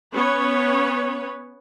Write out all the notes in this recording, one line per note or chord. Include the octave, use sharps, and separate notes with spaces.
B3 C#4 B4 C#5